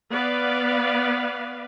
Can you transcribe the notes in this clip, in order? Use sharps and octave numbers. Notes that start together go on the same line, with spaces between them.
B3 B4 D5 F5